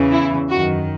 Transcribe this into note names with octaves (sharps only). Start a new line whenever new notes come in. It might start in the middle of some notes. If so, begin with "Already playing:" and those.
Already playing: E2 C#3 E3
E4
F#2 D#3 F#4